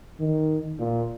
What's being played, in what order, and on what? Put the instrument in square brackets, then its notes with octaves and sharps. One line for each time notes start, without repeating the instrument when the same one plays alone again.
[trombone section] D#3
A#2